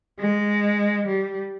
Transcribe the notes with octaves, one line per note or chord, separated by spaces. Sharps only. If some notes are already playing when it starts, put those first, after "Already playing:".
G#3
G3